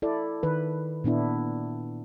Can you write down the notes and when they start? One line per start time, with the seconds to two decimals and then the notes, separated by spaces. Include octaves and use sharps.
0.02 E4 A4 D5
0.43 D#3 B4
1.04 A#2 B3 D4 E4